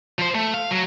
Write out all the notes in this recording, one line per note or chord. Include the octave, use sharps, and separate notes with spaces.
F3 C5
A3
F5
F#3